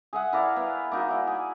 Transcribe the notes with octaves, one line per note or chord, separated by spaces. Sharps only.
G#4 E5 F#5
E4 A#4 D5 F5
B3
A#3 D#4 F#4
E4 D5
G#4